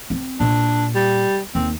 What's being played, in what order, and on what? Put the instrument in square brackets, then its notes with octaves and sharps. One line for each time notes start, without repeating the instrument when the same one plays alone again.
[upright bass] C4
[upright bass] A#2 [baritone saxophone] D4
[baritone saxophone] G3
[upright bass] D#2 [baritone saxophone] C4